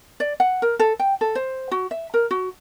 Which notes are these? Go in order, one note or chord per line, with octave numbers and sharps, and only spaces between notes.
D5
F#5
A#4
A4
G5
A4
C5
F#4
E5
A#4
F#4